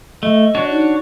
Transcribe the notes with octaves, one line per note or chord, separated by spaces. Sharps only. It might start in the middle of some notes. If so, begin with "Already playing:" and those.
A3 D#5
D4 F#4 C#5
D#4